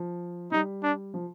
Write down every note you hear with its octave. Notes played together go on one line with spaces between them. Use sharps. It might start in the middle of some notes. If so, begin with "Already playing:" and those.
Already playing: F3
G3 D#4
D4
F3